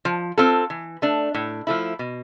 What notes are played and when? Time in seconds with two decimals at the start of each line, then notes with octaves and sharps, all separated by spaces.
0.05 F3
0.38 C4 F4 A4
0.70 E3
1.02 A3 D4
1.34 A2
1.67 F3 A3 E4
1.99 B2